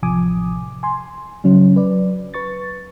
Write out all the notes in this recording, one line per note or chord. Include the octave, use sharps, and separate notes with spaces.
A1 C3 F3 G#5 D6 D#6
G#5 C6
C#3 F#3 C#4
B4 D5
B4 C#6 A6